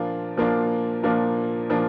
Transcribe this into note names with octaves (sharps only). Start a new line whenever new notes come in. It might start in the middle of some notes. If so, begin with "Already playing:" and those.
Already playing: A#2 F3 A#3 D4 F4
A#2 F3 A#3 D4 F4
A#2 F3 A#3 D4 F4
A#2 F3 A#3 D4 F4